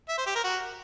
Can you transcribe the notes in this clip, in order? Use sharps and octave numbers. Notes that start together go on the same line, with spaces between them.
E5
C5
G4
A#4
F#4